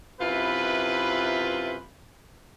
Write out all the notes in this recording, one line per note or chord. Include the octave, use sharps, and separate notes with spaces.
F#2 C3 E4 F4 B4